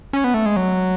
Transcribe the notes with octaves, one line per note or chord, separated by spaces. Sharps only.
C#4
B3
A3
G#3
F#3